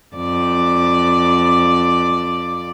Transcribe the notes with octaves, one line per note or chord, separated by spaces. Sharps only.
F2 D5